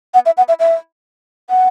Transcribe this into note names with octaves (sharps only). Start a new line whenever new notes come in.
F#5
E5
F#5
E5
E5
F#5